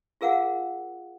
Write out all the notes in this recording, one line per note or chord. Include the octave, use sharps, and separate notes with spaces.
F4 G#4 A#4 F5 F#5